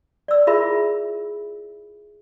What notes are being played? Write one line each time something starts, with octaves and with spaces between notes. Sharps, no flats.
D5 E6
E4 F4 G#4 A#4 E5 B5